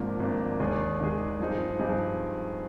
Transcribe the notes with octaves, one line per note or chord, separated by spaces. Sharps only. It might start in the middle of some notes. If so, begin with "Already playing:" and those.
Already playing: G#1 G#2 F3 A#3 D4
G#1 G#2 F3 A#3 D4
D#2 D#3 G#3 D4 G#4
D#2 D#3 G#3 D4 G#4
G2 F3 C4 D#4 G#4
G2 F3 C4 D#4 G#4